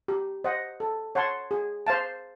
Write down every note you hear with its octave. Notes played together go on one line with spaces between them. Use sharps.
G4
C5 D#5 F#5
A4
C#5 F#5 A5 C6
G#4
C5 F5 A5